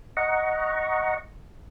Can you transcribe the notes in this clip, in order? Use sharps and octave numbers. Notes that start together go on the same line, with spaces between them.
D#5 F#5 A#5 C#6